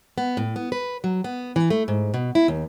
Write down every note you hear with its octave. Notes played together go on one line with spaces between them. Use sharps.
B3
A2
B3
B4
F#3
B3
E3
A3
G#2
B2
E4
D#2